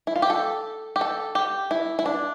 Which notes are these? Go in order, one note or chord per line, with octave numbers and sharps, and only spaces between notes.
E4
F4
G4
A4
G4
A4
G4
E4
E4
D4